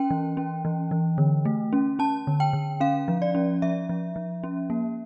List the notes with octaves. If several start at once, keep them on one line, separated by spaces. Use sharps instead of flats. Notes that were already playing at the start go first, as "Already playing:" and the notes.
Already playing: C#4 G5
E3
C#4
E3
E3
D3
A3
C#4
C#4 A5
D3
G5
D3
C#4 F5
F3
D5
C#4
F3 E5
F3
F3
C#4
A#3